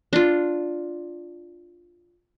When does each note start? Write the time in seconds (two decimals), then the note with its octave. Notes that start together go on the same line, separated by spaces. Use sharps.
0.13 D4 F4